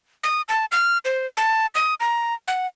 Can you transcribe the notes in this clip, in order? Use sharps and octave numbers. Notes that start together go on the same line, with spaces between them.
D#6
A5
F6
C5
A5
D#6
A#5
F#5